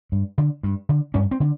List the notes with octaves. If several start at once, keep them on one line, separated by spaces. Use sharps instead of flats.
G2
D3
G2
D3
G2 C#4
C4
D3